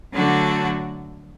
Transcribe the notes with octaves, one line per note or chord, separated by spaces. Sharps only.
D3 F#3 A3 D4 F#4